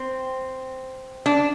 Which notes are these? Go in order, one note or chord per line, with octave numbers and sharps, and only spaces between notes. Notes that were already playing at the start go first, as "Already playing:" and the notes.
Already playing: C4
D4